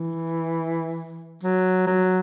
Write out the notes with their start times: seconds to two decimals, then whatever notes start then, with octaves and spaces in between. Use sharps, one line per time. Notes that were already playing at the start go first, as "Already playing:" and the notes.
Already playing: E3
1.43 F#3
1.87 F#3